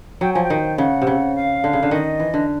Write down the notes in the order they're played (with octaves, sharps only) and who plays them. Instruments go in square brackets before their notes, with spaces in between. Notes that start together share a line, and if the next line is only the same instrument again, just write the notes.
[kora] F#3 [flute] G5
[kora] F3 [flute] G#5
[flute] G5
[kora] D#3
[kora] C#3 [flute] F#5
[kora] C3
C#3
[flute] F5
[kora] D3
C#3
D3
[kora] D#3 [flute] D#5
[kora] E3
D3